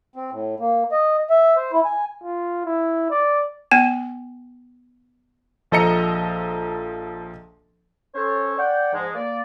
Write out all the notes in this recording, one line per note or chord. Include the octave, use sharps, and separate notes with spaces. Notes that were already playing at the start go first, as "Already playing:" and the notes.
C4
A2
A#3
D#5
E5
C5
E4
G#5
F4
E4
D5
B3 G#5
A#1 F3 A4 D#5 A#5 C#7
C#4 A4 C5 C#5
D5 F#5 G5
G#2 F3 G#3
A#3 D5